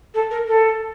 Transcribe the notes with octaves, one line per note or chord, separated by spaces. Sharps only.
A4
A#4
A4